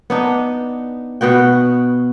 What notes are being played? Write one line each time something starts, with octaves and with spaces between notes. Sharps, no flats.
B3 D4 D#4
B2 B3 F#4 G5